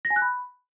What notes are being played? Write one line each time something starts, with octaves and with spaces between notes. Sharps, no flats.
A#6
G#5
F#6
B5